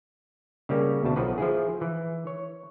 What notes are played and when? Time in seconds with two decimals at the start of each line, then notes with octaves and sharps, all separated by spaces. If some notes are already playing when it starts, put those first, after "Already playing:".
0.69 C#3 G3 A#3 C#4
1.03 D2 B2 A5
1.16 B1 F3 F#4 B4
1.38 F3 E4 G#4
1.81 E3
2.27 C#5